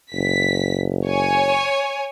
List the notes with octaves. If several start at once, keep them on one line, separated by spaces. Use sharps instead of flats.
F#1 B6
C#5 G#5